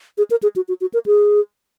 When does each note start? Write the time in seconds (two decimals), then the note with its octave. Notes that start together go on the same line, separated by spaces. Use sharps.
0.18 G#4
0.31 A#4
0.43 G#4
0.56 F#4
0.68 F#4
0.81 F#4
0.94 A#4
1.06 G#4